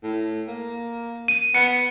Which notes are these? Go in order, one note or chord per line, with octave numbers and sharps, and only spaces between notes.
A2
A#3
D#7
B3 C#7